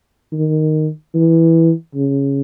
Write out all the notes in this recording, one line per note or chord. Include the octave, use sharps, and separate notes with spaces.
D#3
E3
C#3